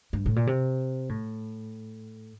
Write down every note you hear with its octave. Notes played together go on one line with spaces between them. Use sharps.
G2
A2
A#2
C3
A2